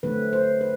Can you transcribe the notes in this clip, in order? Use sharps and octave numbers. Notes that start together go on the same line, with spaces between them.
D3 F#3 A3 C4 B4
C5
B4